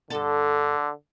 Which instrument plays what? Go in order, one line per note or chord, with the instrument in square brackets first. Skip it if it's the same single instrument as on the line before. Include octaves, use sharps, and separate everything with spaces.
[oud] G2 A4 [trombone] D3